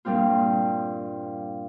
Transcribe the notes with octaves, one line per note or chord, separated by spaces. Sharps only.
G2 A#2 G3 C4 F4